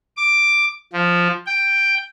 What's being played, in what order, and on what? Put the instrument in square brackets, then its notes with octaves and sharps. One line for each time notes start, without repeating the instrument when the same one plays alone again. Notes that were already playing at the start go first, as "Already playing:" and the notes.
[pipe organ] D6
F3
G5